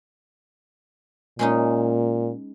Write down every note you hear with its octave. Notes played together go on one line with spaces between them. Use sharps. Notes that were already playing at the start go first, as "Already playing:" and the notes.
A#2 G#3 C#4 D#4